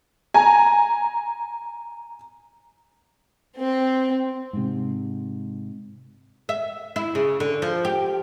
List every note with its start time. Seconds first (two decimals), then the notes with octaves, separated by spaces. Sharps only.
0.34 G#5 A#5
3.57 C4
4.53 G#2 C3
6.49 E5
6.96 E4
7.15 C#3
7.40 D3
7.62 F3
7.85 G4